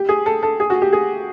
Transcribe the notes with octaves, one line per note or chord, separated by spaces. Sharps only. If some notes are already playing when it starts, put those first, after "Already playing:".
Already playing: G4
G#4
A4
A4
G#4
F#4
G4
G#4